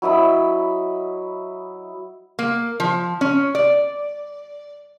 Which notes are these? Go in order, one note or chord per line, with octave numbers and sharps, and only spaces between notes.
F#3 E4 D#5 B5
A#3
F3
C#4
D5